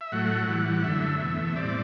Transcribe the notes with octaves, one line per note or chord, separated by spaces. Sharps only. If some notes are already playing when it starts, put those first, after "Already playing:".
E5
A2 F#3 A3 F#5
A2 E3 G3
F#2 D3 A3 E5
E2 B2 A3
A2 G3 C4 D5